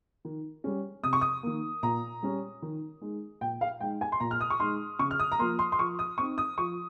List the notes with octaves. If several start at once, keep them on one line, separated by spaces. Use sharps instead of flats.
D#3
G3 C#4
C3 D#6
C#6
D#6
D#3 A#3
A#2 A#5
G3 C#4
D#3
G#3 D#4
A#2 G5
F5
G#3 D#4 G5
G#5
C6
A#2 A#5
F6
D#6
C#6
G#3 D#4 C6
C#3 C#6
F6
D#6
A#5
F3 A#3 C6
C6
C6
F3 C#6
D#6
C4 D#4 C#6
D#6
F3 C#6